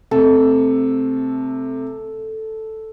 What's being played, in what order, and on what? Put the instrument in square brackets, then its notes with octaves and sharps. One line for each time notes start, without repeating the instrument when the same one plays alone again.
[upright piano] C3 A3 [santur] A4